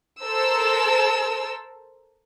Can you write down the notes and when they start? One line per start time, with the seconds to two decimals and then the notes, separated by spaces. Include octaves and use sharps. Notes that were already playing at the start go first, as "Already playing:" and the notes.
0.22 A4 A#4 C5 E6